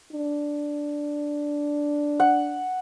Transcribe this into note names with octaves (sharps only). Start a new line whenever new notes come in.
D4
F#5